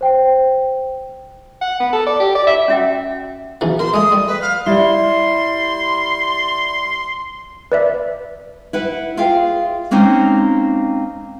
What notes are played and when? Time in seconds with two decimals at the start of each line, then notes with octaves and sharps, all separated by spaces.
0.01 C5 G5
1.61 F#5
1.80 B3
1.93 A4
2.06 D5
2.20 G4
2.35 D5
2.47 E5
2.68 C#4 F#4 E5 F#5 G5
3.61 B1 C#3 E3
3.79 A#4 C6
3.94 G#3 A3 D#6
4.12 G3
4.28 B4
4.41 F5
4.66 G3 E4 C6
7.72 B4 D5 E5
8.73 E4 B4 F#5
9.17 F4 G#4 E5 F5 G5
9.91 G#3 A#3 C4 C#4 D#4